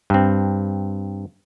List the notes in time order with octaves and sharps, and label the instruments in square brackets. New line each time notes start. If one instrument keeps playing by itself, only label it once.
[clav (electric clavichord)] G2 C4